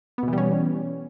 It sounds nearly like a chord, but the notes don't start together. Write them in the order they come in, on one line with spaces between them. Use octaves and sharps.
B3 B2 E3 G3 C#4